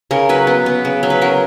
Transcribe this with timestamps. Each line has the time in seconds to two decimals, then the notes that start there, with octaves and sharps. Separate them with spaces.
0.11 C#3 A#4
0.29 F#3 B4
0.47 B3
0.66 B3
0.85 C#3
1.03 F#3
1.10 B4
1.22 F#3 A#4